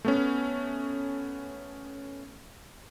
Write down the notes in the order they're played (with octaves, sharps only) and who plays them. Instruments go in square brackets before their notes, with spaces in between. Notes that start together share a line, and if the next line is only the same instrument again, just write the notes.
[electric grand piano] A3 B3 C#4